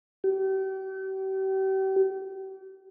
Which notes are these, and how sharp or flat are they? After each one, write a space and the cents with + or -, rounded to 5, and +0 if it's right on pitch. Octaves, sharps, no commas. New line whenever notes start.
G4 -40